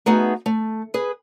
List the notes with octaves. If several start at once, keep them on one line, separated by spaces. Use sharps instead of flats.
A3 B3 D#4 F#4 G#4
A3
G#4 B4